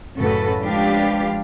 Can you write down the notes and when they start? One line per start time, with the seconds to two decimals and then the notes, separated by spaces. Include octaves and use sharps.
0.16 F#2 A2 C#3 F#4 A4 B4
0.61 F3 G#3 D4 G4 B4 F5